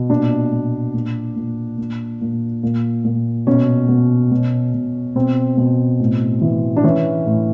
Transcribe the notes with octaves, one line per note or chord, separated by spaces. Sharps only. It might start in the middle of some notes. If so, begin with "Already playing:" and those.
Already playing: B2
A#2 D4
A#2
A#2
A#2
A#2
A#2
A#2
A#2
B2 C#4
B2
B2
B2
B2 C4
B2
A2
E3
D4
E3 C#4
A2